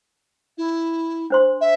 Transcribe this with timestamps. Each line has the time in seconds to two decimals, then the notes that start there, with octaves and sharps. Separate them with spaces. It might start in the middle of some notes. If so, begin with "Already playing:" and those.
0.57 E4
1.30 D4 C5 C6
1.60 E5